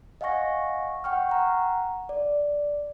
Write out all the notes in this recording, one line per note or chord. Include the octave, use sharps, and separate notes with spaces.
D#5 F5 F#5 G#5 C#6 A#6
F#5 G5 C#6 F6
F#5 A#5
D5